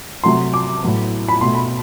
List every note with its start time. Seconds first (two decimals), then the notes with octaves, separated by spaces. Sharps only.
0.24 C3 F#3 A3 C6
0.54 D6
0.83 A2 F#3 B3
1.29 B5
1.41 B2 A3 C6
1.55 B5